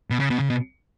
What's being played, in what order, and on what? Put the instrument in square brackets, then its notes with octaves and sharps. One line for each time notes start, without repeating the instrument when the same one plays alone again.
[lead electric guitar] B2
C#3
B2
C#3
B2